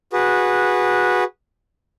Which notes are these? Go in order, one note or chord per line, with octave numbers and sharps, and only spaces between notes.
F#4 G#4 B4